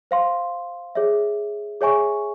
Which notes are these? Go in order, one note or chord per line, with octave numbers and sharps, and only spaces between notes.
C5 F5 C6
G#4 C#5 E5
G#4 C#5 E5 G#5 C#6